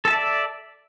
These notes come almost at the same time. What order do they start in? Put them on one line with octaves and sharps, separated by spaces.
A4 A5 E5 D5